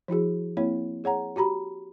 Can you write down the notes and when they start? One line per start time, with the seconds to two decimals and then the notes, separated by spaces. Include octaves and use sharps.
0.08 F3 E4 F#4 G#4
0.57 A#3 C4 E4 C#5
1.04 G#4 C#5 F#5 A#5
1.36 F#4 G4 A#5 B5